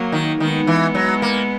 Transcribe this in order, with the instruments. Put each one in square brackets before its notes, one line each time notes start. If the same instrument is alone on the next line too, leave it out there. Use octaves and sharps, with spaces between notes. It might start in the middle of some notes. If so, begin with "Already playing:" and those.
Already playing: [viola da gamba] F#3 A#3
[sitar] D#3
[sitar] D#3 [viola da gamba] G#3 B3
[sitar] E3
F#3
A#3